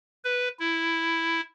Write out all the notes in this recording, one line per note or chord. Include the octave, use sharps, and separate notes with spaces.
B4
E4